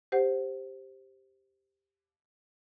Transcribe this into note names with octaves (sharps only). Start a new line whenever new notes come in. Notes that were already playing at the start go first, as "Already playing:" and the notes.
G4 C5 F#5